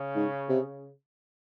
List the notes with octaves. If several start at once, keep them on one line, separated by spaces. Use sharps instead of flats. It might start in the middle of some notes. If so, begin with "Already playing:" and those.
Already playing: C#3
G#2
C3